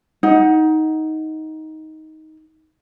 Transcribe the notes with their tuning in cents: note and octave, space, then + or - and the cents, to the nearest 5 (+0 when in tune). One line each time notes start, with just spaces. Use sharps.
D#4 +15 F#5 +0